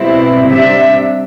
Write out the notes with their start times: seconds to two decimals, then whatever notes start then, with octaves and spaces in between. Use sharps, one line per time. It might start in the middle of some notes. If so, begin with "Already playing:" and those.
Already playing: B2 G3 C4 E4
0.48 C3 G3 D4 E5